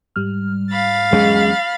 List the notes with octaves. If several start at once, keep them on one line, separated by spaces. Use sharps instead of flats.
G#2 G3 F6
F5 B5 A6
E2 F#3 G#3 C#4